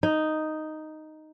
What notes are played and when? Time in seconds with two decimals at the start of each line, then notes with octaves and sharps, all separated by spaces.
0.03 D#4